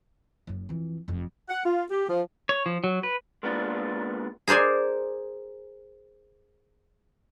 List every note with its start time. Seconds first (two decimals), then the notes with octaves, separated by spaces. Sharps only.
0.47 F#1 F#2
0.69 F2 E3
1.08 F1 F2
1.49 F#5
1.65 F4
1.90 G4
2.09 F3
2.49 C#5
2.66 F3
2.84 F#3
3.03 B4
3.43 G#3 A#3 B3 D4 F4
4.47 G#4 A#4 C5 D5 G#5